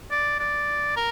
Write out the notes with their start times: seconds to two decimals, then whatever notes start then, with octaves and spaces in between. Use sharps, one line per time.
0.11 D5
0.39 D5
0.96 A#4